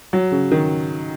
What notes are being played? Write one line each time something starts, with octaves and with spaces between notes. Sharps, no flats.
F#3
C#3
D#3